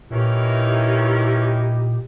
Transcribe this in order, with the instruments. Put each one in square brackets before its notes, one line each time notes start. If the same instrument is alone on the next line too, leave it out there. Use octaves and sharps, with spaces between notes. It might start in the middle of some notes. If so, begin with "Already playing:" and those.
[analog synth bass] A#2 [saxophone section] D#3 E3 C#4 [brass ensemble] A#3 D#4 E4 [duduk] G4